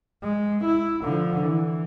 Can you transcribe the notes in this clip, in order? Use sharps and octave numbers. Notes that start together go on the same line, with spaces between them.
G#3
E4
D3 F3
E3